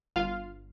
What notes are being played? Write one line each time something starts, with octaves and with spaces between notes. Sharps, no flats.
G1 F4 F5